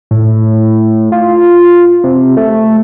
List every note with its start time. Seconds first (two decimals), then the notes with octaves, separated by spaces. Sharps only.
0.11 A2
1.12 F4
2.04 C3
2.37 A3